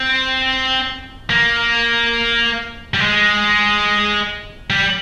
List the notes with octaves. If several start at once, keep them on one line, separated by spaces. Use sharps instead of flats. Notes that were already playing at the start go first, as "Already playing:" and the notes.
Already playing: C4
A#3
G3
G#3
G3